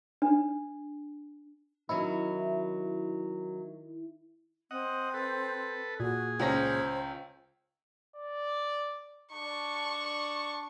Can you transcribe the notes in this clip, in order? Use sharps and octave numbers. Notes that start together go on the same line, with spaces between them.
D4
D#3 F#3 C#4 D#4 E4
C4 D#5 F#5
A4 B4
A#2 F#4 G#4
C#2 C#4 C5 A#6
D5
D4 C#6